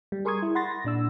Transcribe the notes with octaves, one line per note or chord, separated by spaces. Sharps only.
G3
G#4 A#4 C6 C#6 D#6 G#6
E4
F#5 B5 C6 A6 A#6
A#6
A#2 D4 E6